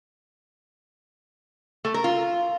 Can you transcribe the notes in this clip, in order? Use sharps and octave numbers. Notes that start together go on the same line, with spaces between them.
A3
A#4
F4